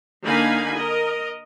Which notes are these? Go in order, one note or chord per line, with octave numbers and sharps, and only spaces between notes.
D3 A#3 D#4 F5 G#5 B5
A#4 D#5